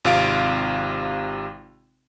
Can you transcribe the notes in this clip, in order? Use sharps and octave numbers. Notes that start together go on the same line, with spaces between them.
G#1 C3 F4 F5 D7